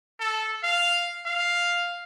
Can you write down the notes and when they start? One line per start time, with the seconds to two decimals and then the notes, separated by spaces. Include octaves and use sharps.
0.19 A4
0.63 F5
1.26 F5